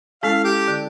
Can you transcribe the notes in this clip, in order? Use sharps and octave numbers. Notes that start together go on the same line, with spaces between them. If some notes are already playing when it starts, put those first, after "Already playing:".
G#3 C#4 E4 A4 F5
G4
D3